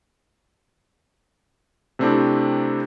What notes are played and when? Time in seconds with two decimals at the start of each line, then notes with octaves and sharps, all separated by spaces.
1.99 C3 A3 C4 D4 E4 G4